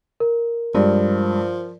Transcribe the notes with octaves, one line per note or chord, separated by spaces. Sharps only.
A#4
G2 F3 G#3